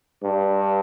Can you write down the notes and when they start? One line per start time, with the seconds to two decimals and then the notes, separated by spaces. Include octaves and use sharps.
0.23 G2